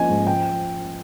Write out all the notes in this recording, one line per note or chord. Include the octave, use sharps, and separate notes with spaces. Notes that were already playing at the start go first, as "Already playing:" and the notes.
Already playing: F3 A#3 C#4 D#5 G#5
G#2
F3 G5